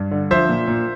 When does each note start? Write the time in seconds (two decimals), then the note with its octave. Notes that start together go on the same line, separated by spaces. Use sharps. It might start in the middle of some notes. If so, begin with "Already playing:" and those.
Already playing: G2
0.11 D3
0.31 F3 C5 E5
0.49 A#2
0.68 A#2